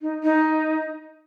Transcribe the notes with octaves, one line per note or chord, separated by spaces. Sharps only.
D#4
D#4